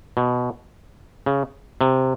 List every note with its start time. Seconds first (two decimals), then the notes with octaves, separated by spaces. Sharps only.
0.17 B2
1.26 C#3
1.81 C3